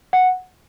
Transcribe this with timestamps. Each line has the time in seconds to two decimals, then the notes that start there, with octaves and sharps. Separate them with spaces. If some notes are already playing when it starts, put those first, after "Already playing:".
0.13 F#5